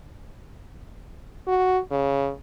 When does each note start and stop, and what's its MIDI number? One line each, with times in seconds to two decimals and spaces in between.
1.47 1.79 66
1.91 2.31 49